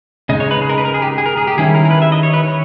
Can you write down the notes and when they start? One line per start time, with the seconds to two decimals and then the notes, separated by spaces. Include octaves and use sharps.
0.29 C#3 G#3 D#4 D#5
0.40 C#5
0.51 B4
0.62 G#4
0.69 A#4
0.78 B4
0.85 A#4
0.94 G#4
1.02 G4
1.18 G#4
1.26 A#4
1.37 G#4
1.47 G4
1.58 D#3 G3 C#4 E4 G#4
1.75 A#4
1.85 A#4
1.91 B4
2.02 E5
2.12 D#5
2.23 C#5
2.33 B4
2.43 C#5